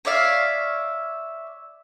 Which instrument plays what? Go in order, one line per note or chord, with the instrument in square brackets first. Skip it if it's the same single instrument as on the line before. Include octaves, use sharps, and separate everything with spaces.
[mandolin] C#5 D5 E5 F5